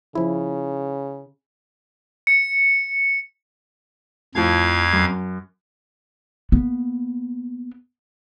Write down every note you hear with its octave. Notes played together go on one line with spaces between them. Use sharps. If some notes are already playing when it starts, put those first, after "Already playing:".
C#3 F3 E4
C#7
F2 A2 F3 F5 G#6
F#2
A#3 B3